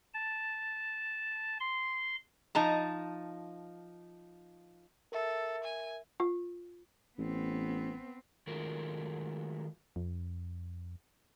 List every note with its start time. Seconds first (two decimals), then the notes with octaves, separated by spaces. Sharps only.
0.14 A5
1.60 C6
2.55 F3 D#4 A5 A#5
5.12 A4 A#4 E5
5.64 G#5
6.20 F4
7.19 A1 B3 C4
8.47 D#3 F#3 G#3 A3 F4 A#4
9.96 F2